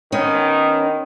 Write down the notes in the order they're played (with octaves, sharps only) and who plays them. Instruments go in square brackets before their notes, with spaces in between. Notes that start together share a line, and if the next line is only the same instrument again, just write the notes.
[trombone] D#3 [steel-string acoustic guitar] B3 C#4